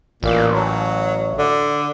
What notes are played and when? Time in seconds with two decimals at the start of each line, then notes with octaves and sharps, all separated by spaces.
0.23 A1 A#2
0.52 F#3
1.38 D3